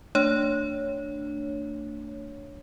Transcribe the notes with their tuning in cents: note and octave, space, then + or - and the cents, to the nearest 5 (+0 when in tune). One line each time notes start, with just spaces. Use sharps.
A3 +40 D4 +0 C#5 +0